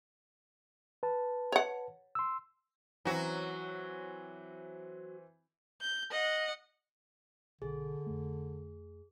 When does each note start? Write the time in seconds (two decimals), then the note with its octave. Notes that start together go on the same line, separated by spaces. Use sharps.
1.03 B4 A5
1.52 C#5 F#5
2.15 C6 E6
3.05 E3 F#3 C4 F#4
5.81 G6
6.11 D#5 F#5
7.62 B1 D3 G#4
8.07 F2 A3